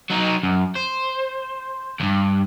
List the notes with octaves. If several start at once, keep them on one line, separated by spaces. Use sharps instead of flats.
F#3 D#4
F#2
C5
E2 G2